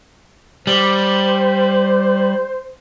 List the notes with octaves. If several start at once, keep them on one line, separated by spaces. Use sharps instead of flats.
G3 C5